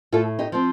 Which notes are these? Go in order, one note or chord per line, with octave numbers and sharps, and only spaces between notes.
A2 F4 A4
D#4 G4
F3 C4